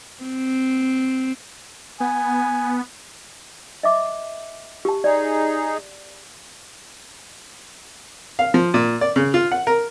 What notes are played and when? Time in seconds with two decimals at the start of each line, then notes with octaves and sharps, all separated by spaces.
0.23 C4
2.00 B3 G#5
3.83 D#5 E5 D6
4.85 G4 A5
5.04 D#4 G#4 D5
8.39 F5
8.54 F3
8.74 A#2
9.01 D5
9.16 C#3
9.34 F4
9.52 F#5
9.67 A#4